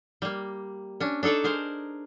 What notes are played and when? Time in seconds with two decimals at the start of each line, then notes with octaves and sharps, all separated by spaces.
0.22 G3 A#3
1.00 C#4 D4
1.23 D4 D#4 A4 C#5 D5
1.44 G#4 A#4 C5